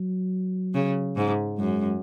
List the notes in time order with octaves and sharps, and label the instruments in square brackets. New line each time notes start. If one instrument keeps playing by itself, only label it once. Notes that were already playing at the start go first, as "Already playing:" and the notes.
Already playing: [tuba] F#3
[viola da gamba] C#3
G#2
[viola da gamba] F#2 [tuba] G#3